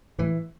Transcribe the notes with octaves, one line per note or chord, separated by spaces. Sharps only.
A2 E3